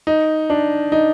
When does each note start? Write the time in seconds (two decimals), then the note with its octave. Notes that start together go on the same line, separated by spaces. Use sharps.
0.07 D#4
0.50 D4
0.92 D#4